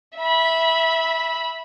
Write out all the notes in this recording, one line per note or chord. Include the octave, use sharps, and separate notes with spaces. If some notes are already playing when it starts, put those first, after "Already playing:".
E5 B5